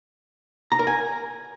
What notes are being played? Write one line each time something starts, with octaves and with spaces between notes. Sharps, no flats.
A#5
A#4
G#5